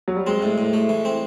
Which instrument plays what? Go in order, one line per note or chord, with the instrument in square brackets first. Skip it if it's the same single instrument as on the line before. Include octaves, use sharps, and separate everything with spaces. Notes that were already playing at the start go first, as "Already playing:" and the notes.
[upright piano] F#3
G3
[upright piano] G#3 [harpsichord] C4
[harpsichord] A2
A2
A3
E3
C4